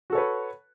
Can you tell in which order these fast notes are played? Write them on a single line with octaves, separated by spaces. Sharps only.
F#4 A4 C#5 B4